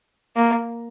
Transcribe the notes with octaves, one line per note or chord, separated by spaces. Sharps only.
A#3